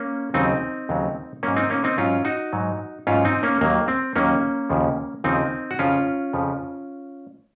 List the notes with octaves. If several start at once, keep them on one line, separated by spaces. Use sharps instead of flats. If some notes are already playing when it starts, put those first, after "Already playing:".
Already playing: A#3 C#4
D#2 C#3 F#3 C4 D#4
D#2 C#3 F#3
G#2 F#3 A#3 C#4
C4 D#4
A#3 C#4
C4 D#4
G#2 F#3 C#4 F4
D#4 F#4
G#2 F#3
G#2 F#3 C#4 F4
C4 D#4
A#3 C#4
D#2 D#3 F#3 A#3
C4
D#2 D#3 F#3 A#3 C#4
D#2 C#3 F3
D#2 C#3 F3 C4 D#4
F#4
F2 C#3 F3 C#4 F4
F2 C#3 F3